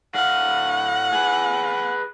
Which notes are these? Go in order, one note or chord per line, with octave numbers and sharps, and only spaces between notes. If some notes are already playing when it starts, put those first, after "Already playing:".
A2 F5 F#5
G#4 B4